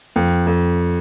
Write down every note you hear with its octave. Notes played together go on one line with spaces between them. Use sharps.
F2
F2